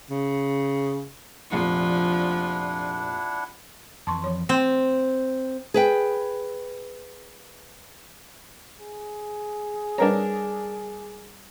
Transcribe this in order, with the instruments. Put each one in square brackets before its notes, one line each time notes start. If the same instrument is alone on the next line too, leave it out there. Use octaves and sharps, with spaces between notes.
[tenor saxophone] C#3
[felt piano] F1 A#1 A#5 [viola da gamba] F3 [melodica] D4 E4 F#5
[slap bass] F2 E3 [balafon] A5 C6 C#6
[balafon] F3 C#5 C6
[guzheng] C4
[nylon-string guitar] G#4 B4 G5
[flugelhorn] G#4
[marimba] G3 B4 C#5 [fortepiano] D4 A#4 A#5